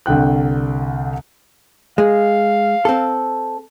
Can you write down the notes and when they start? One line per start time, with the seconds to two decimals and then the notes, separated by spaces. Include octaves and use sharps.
0.06 C2 D3 G5 F#6
1.98 G#3 F5
2.85 C4 A4